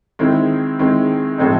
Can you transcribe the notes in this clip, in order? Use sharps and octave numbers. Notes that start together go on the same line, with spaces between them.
D#3 G#3 C4 E4
D#3 G#3 C4 E4
A2 F3 G#3 C4 D#4